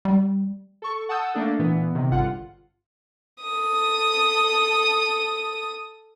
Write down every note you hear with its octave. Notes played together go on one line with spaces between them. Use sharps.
G3
A4 C#6
F#5 A5 D#6 E6 G6
A3 A#3 D4 A4
A#2 E3 B3
C3 D#3
G#1 G2 D3 F4 F#5
A4 D#6